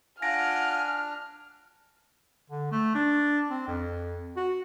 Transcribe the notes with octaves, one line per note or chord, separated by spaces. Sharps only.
D4 F4 F#5 G#5 F6 A#6 D7
D3
A3
D4
C4
F2
F#4